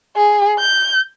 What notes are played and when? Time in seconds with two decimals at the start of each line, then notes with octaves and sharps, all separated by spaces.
0.16 G#4
0.59 G6